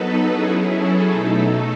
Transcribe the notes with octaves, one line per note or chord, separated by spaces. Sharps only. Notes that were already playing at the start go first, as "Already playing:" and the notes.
Already playing: F#3 B3 D#4 A4 B4
F#3 C#4 E4 G#4
A4
B2 A3 D#4